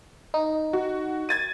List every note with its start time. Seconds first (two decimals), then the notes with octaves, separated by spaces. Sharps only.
0.34 D#4
0.73 F#4
1.29 G#6 A6 D#7